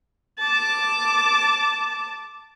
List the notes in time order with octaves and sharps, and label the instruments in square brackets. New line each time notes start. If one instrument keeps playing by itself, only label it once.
[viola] A5 D6